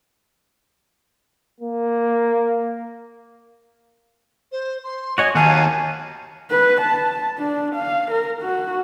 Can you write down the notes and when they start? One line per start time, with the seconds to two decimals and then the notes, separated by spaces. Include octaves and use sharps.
1.60 A#3
4.52 C5
4.84 C6
5.18 F#4 C#5 D#5 G#5
5.35 D#2 F#4 F5 G#5 A5
6.51 B4
6.81 A5
7.38 D4
7.76 F5
8.11 A#4
8.42 F#4